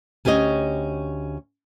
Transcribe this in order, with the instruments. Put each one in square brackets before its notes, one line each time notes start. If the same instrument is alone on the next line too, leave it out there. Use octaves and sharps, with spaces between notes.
[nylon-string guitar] D2 C#4 G4 C#5 D#5